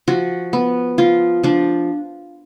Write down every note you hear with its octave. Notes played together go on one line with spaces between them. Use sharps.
F3 F#4
B3
F3 F4
F3 D4